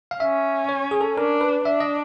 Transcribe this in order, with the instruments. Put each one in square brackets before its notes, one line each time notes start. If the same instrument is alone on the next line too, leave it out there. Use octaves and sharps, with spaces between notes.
[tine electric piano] F5
[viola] C#4 [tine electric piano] E5
[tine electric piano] C#5
G#4
A4
[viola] D4 [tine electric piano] A#4
[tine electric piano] B4
[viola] D4 [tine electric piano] E5
[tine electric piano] D#5